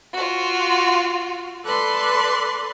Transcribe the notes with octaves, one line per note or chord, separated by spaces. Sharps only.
F4 F#4
A4 B4 D5 C6 F#6